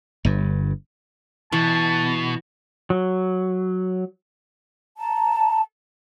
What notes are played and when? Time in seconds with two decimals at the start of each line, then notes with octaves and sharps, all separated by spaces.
0.25 G1 G2
1.52 B2 E3 A5
2.90 F#3
4.98 A5 A#5